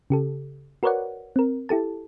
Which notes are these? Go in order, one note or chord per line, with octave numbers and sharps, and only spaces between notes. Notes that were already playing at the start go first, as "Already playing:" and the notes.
C#3 G4 A4
F#4 A#4 B4 C#5 D5 F#5
C4 A#4
E4 G4 A4 A5